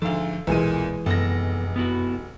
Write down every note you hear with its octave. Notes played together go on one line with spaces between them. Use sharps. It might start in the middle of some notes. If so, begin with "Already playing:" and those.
D2 G#2 F3 A4 F5
B1 E2 A#2 E3 G#3 G#4 D#7
F1 F#2 B3 A4 A#6
B3 E4 F#4